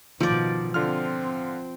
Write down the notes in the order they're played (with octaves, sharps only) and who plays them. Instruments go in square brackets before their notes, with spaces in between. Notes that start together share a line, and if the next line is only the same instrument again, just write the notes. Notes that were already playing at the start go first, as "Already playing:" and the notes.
[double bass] B2 D#3 [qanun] F3 D5
[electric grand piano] D3 F4 F6 [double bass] C4